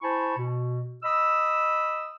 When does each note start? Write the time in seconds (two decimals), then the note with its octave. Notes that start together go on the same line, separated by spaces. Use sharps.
0.01 E4 C5 G#5 A5 B5 C#6
0.37 B2
1.03 D#5 B5 D#6 E6